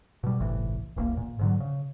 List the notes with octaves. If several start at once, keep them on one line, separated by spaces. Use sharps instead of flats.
B2 G3
G1 C2 A2 E3
D1 A#1 E2 A#3
A#2
G#2 D3 F#3
C#3